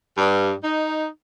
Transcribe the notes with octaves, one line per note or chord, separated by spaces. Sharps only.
G2
D#4